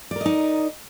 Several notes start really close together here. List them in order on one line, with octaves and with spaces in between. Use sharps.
D5 A#4 D#5 D#4